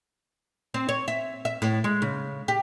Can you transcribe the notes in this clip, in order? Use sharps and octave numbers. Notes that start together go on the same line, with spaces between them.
C4
C#5
E5
E5
A2
G#3
C#3
G4